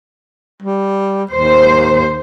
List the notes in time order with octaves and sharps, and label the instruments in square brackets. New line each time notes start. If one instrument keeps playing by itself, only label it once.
[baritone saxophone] G3
[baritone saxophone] D#2 [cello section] C5